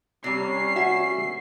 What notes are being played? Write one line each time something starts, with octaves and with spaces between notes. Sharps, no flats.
C3 G3 C#4 C7
F#4 E5